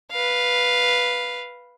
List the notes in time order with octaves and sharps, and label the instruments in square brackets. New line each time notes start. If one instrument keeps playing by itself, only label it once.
[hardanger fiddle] B4 F5